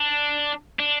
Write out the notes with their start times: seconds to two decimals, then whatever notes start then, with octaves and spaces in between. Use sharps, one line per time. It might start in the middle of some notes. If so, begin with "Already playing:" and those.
Already playing: D4
0.79 D4